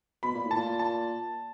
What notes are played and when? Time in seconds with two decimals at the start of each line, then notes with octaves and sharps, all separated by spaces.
0.23 B2 B5
0.35 A#2
0.45 A2
0.51 A5
0.56 A#2
0.79 A5